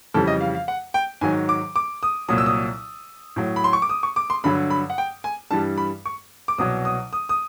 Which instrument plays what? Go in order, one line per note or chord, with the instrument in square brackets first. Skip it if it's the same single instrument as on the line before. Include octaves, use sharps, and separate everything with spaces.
[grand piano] F2 C#3 E3 G3 A4
D#5
F5
F5
F#5
G5
G#2 D#3 F#3 G#5
D6
D6
D#6
C2 A#2 F#3 D#6
E6
D#6
A2 F#3
B5
C6
C#6
D6
D#6
C#6
D6
C6
G2 D3 F#3 B5
B5
F#5
G5
G#5
G2 E3 G3 A5
B5
C#6
D6
C2 B2 F#3 D#6
D#6
D#6
D#6